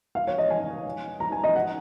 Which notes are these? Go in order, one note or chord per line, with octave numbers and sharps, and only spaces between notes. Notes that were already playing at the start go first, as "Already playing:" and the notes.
F5
C#5
D#5
G#5
A#5
G#5
D#5
F#5